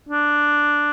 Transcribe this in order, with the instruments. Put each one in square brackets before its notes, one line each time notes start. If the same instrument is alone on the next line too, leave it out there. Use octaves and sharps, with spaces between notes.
[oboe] D4